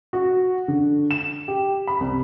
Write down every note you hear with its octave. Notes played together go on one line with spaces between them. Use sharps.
F#4
D3
E7
G4
B5
C2